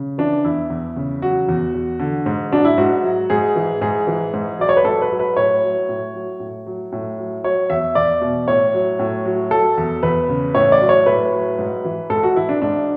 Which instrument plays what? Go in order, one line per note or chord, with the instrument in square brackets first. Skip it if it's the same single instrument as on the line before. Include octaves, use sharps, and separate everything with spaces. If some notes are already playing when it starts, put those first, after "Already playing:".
Already playing: [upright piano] C#3
E3 D4
E2 E4
E2
C#3
F#3 F#4
E2
E2
D3
G#2
F#3 D4
E4
G#2 F#4
F#3
G#2 G#4
E3
G#2 G#4
E3
G#2
F#3 D5
C#5
B4
G#2 A4
B4
F#3
B4
A2 C#5
F#3
A2
F#3
A2
F#3
A2
F#3
F#3 C#5
E2 E5
E2 D5
B2
A2 C#5
F#3
A2
F#3
F#3 A4
E2
E2 B4
C#3
A2 C#5
D5
F#3
C#5
A2 B4
F#3
G#2
E3
G#2 A4
F#4
E3 E4
D4
G#2 D4